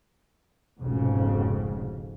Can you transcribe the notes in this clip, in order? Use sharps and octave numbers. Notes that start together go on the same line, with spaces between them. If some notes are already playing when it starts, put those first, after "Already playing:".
F1 B1 F2 G#2 C#3